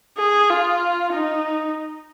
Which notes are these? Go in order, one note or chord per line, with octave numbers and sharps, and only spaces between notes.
G#4
F4
D#4